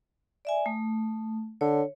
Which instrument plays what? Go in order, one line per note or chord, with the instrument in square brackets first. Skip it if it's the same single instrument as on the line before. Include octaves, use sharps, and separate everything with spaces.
[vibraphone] D5 E5 G#5
A3
[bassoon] D3 [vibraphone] C#5